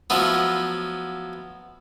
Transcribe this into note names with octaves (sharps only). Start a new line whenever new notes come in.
F3 F#3 A3 B3